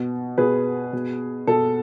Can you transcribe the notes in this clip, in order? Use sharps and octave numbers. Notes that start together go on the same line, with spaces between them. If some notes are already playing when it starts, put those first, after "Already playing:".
Already playing: B2
B2 G#4 B4
B2
B2 A4